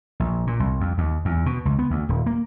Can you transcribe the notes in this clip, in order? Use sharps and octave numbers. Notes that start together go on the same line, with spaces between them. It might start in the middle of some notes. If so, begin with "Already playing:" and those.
A#1
A#2
C2
F2
D#2
E2
B2
C#2
B3
D2
D#1
A#3